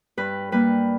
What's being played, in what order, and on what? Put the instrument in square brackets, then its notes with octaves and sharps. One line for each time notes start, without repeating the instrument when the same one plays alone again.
[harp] G2 B4
G3 A#3 B4